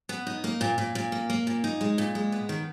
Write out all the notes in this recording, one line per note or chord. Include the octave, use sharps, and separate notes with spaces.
B3
D#4
A#3
A#2
A#2
A#2
A#3
A#3
A#2
D#4
G#3
A#2
G#3
B3
D#3